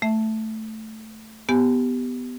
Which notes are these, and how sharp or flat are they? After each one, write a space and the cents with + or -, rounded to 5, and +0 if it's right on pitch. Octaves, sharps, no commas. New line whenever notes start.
A3 +0 E5 +0
B3 +10 G4 +0 G#5 +0